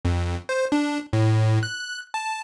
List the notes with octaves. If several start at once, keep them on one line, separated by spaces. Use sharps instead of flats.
F2
C5
D4
A2
F#6
A5